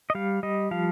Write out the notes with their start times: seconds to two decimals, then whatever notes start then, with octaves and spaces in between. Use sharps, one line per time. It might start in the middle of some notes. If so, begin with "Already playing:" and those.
0.10 D#5
0.15 G3 F5
0.43 G3 D#5
0.71 F3 F5